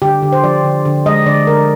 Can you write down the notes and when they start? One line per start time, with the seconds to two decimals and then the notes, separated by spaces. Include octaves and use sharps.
0.02 D3 G4
0.22 D3
0.32 C5
0.44 F3 D5
0.64 D3
0.85 D3
1.06 G#3 D#5
1.26 D3 D5
1.47 D3 A#4